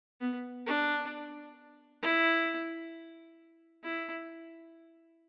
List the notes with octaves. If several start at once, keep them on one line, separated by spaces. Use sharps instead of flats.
B3
D4
E4
E4